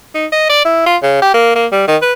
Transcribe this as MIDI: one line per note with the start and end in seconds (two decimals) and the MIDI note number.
0.15 0.26 63
0.32 0.49 75
0.50 0.65 74
0.65 0.84 64
0.86 0.97 65
1.03 1.19 49
1.22 1.29 67
1.34 1.54 58
1.56 1.66 58
1.72 1.84 55
1.88 1.96 51
2.02 2.13 71